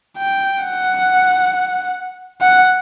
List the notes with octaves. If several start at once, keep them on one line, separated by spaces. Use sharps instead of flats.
G5
F#5
F#5